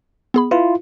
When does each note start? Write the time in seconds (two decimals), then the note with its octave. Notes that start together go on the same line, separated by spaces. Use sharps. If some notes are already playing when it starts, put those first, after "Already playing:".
0.34 B3 G#4 B5
0.51 E4 F4 B4